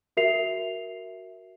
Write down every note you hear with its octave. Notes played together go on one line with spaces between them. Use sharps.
F#4 A#4 E5 C7 F7